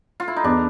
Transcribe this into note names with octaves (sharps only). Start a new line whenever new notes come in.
F4
E4
D#4
E2 D4